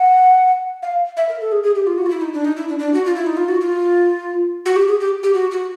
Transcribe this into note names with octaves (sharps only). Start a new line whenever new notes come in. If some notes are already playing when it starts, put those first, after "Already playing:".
Already playing: F#5
F5
E5
A#4
A4
G#4
G#4
G4
F4
F#4
F4
E4
D#4
D4
D#4
E4
D4
D4
F#4
F4
E4
D#4
F4
F#4
F4
F#4
G4
G#4
G4
G4
F#4
F#4